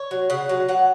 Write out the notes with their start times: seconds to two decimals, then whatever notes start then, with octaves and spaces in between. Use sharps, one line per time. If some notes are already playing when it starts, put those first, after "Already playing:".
Already playing: C#5
0.11 F#3
0.30 C#3 F#5
0.49 F#3
0.68 F#3 F#5